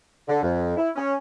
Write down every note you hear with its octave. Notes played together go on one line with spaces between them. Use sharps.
D3
F2
E4
C#4